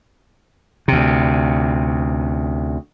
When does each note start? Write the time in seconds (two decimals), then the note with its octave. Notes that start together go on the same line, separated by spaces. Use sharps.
0.88 D2 C3